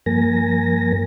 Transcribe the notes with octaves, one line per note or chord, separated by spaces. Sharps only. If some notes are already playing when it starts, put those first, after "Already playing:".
G2 F3 A#3 A#4 G#5 A#6